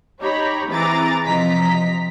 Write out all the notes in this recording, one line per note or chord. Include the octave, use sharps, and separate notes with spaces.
D#4 G4 C#5 A#5 B5
E3 C4 G#4 A#5 D6 A6
C3 F3 D#5 A#5 B6